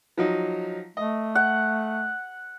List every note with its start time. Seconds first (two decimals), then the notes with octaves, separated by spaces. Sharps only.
0.17 F3 F#3 D#4
0.97 A3 D#5
1.35 F#5